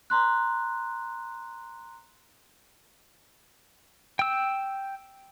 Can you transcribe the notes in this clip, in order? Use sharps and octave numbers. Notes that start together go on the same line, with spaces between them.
A#5 C6 F#6
G5 E6